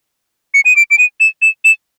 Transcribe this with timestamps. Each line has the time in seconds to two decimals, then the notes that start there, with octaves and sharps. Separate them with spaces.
0.54 C#7
0.65 D#7
0.76 D7
0.91 D7
0.98 D#7
1.20 E7
1.42 E7
1.64 E7